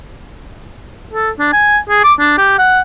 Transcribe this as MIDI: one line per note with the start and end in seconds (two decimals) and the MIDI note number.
1.14 1.30 69
1.39 1.48 62
1.53 1.78 80
1.89 2.02 68
2.04 2.14 86
2.20 2.34 62
2.38 2.58 67
2.58 2.81 78